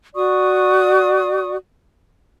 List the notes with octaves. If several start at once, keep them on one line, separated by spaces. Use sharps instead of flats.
F#4 D5 C#6 D#6